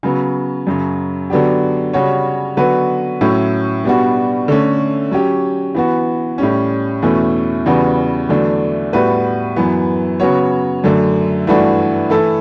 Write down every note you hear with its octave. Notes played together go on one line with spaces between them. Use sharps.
C#3 F#3 B3
F#2 C#3 F#3
D3 F#3 B3 D4 G4
C#3 G3 C#4 F#4 C#5
D3 F#3 B3 F#4 B4
A2 F#3 C#4 E4
B2 G3 B3 D4 F#4
D3 A3 C#4
F#3 C#4 G4
E3 B3 F#4
A2 G3 C#4
E2 B2 A3 C#4 E4
E2 C#3 G3 B3 F#4
E2 D3 F#3 A3 D4
A2 G3 B3 F#4 B4
F#2 E3 B3
C#3 F#3 B3 F#4 C#5
F#2 D3 A3
G2 E3 A3 D4 F#4
E3 A3 E4 A4